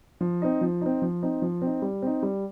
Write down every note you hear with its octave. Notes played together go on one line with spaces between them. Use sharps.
F3
C4 D#4
F3
C4 D#4
F3
C4 D#4
F3
C4 D#4
G3
C4 D#4
G3